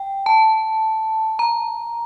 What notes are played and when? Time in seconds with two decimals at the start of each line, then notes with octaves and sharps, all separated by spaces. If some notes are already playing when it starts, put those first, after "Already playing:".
Already playing: G5
0.26 A5
1.39 A#5